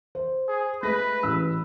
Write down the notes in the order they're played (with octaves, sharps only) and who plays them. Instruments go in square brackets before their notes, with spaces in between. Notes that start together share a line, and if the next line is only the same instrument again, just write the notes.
[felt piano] C5
[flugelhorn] G#4
[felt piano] G#3 A3 A#6 [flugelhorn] B4
[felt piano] A1 E6